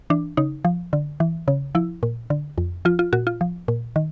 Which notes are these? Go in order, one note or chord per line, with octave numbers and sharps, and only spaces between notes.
E3 D4
C#3 D#4
F3
D3
E3
C#3
F3 E4
A#2
D3
F2
F3 F4
F4
A#2 F#4
F4
F3
A#2
D#3